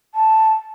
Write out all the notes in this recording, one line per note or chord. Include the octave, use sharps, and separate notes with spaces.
A5